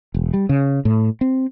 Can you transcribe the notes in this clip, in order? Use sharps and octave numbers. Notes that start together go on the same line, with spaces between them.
E1
G3
C#3
A2
C4